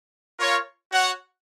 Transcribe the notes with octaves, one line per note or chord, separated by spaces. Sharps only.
F4 A#4 C#5 F5
F#4 C#5 F#5